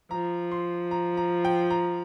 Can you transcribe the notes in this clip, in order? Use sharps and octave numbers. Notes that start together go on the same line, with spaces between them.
F3 A#5
C6
A#5
A#5
G5
A#5